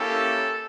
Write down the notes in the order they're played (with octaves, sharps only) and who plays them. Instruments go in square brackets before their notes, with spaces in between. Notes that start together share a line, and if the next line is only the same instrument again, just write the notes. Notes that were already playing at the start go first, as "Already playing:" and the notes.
Already playing: [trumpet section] A#3 C#4 E4 G4 A4